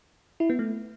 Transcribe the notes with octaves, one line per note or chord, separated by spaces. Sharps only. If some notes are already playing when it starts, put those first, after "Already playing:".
E4
B3
A3